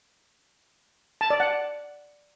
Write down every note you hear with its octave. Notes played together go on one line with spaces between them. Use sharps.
A5
D5
F#5